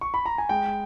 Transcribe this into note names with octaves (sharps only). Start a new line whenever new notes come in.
C#6
B5
A#5
G#5
G#3 G5